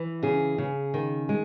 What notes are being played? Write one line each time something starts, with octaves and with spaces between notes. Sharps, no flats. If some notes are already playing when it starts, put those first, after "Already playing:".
Already playing: E3
C#3 G#4
C#3
D#3
G#3